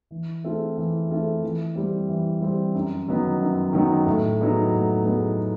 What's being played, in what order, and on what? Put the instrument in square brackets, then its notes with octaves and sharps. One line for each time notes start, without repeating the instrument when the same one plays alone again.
[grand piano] E3
A3 C4 F4 G#4
E3
A3 C4 F4 G#4
E3
G3 C4
E3
G3 C4
F#2
D#3 F#3 B3 D#4
F#2
D#3 F#3 B3 D#4
A2
F#3 B3 D#4 G#4
A2
F#3 B3 D#4 G#4